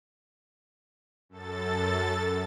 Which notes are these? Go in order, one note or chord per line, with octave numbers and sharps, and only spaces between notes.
F#2 A4 A6